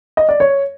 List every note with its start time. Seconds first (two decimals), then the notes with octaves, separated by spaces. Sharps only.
0.17 D#5
0.29 D5
0.40 C#5